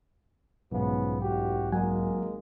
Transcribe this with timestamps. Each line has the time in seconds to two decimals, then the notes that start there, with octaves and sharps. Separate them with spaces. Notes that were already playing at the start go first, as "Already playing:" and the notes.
0.71 B1 G#2 C#3 F3 B3
1.22 A1 F#4 G4
1.72 G#1 F#3 G#3 A#3 F#5 G#5